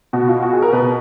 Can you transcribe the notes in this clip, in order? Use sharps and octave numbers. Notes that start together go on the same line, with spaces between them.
B2 F#4
F4
F#4
G#4
A#4
B2 B4